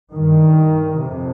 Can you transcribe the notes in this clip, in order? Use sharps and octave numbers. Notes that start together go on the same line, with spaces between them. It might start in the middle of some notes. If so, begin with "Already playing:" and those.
G2 D#3
F2 C3